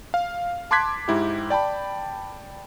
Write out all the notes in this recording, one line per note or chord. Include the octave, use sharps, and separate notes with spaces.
F5
A5 C6 D6 F#6 G#6 B6
G#2 E4 G4
D5 G5 A5 B5